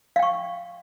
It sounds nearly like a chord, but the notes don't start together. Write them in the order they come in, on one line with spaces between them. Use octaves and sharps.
F5 G5 C#6